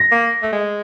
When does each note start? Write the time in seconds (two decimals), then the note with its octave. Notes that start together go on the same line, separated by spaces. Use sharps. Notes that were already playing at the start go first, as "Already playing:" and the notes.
Already playing: A#6
0.11 A#3
0.42 A3
0.52 G#3